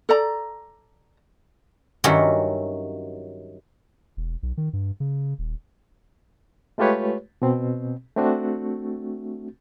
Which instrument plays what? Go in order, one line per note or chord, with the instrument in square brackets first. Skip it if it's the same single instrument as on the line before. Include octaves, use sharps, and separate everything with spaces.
[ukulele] A4 D5 A#5
[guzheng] G2 D#3 F#3 C#4 E4 F#4
[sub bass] E1
B1
D#3
G2
C#3
D#1
[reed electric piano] G#3 A3 F4 G4 B4 C#5
B2 C4
A3 C4 D4 F#4